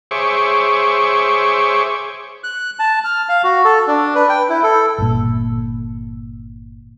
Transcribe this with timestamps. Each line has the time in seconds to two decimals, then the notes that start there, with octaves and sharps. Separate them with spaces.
0.11 G#4 C5 C#5 E5 C#6 D6
2.44 F#6
2.79 A5
3.04 F6
3.29 F5
3.44 F#4
3.65 A4
3.87 D4
4.15 B4
4.29 G5
4.49 E4
4.63 A4
4.98 G1 A#2